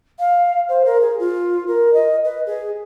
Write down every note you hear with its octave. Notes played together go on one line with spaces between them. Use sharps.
F5
C5
A#4
G#4
F4
A#4
D#5
B4
G#4